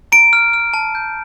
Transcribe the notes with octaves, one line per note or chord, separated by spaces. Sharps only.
A#5 D7
F6
F6
A5
G6